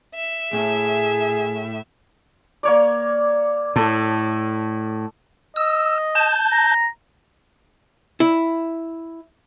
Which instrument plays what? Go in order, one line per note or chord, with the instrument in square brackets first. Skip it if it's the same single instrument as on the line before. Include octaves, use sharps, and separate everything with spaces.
[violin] E5
[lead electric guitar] A2 [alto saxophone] G#4
[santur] A#3 C#5 D5
[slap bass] A2 [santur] A4
[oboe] D#5 [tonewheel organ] E6
[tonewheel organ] A5 G6
[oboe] A#5
[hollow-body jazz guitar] E4